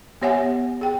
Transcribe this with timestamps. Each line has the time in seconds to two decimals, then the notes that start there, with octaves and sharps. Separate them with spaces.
0.22 B3 G4 C#5 E5 F#5 G#5
0.81 G#4 G5